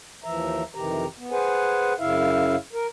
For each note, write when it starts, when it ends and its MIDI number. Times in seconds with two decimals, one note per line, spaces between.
0.24 0.63 39
0.24 0.63 52
0.24 0.63 53
0.24 0.63 76
0.24 0.63 82
0.75 1.06 41
0.75 1.06 48
0.75 1.06 51
0.75 1.06 52
0.75 1.06 67
0.75 1.06 82
1.17 1.31 59
1.31 1.93 68
1.31 1.93 71
1.31 1.93 72
1.31 1.93 78
1.31 1.93 80
1.99 2.56 42
1.99 2.56 49
1.99 2.56 64
1.99 2.56 76
1.99 2.56 77
2.73 2.87 70